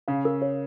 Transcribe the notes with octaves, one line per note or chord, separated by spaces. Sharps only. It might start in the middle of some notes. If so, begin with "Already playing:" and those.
C#3 F5
A#4
C#5